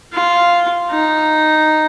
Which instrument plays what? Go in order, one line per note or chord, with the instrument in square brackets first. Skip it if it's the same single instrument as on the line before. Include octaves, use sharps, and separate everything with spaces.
[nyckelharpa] F4
D#4